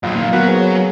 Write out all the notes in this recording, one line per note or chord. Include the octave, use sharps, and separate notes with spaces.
A#1 F#2 A#2 F4
F#2 A#2 D#3
F#3 B3 F#4 A#4 B4
G#2
C#3